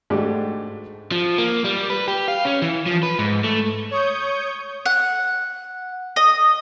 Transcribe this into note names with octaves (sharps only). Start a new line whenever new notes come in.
G#2 A3 D4 F#4 G4
F3
A#3
G3
B4
G4
F5
C#4
E3
F3
B4
G#2
A3
C#5 C#6 D#6 G6
F#5
D#5